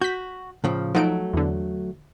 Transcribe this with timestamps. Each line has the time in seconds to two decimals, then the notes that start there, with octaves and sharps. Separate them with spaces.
0.01 F#4 G6 B6
0.64 A2 C#3 F3
0.95 F3 F#3 A3 D#4 D7
1.33 E2 D3